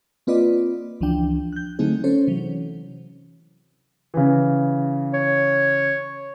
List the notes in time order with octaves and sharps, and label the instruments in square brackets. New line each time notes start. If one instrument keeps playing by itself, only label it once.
[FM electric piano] A#3 C4 F4 B4 D5 D#5
C#2 E3 F3 D4 G5
F#6 G6
D3 F#3 A3 C4 D#4 G#4
C#4 A4 C5 C#5
C3 E3 F#3
[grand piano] C#3 E3
[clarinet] C#5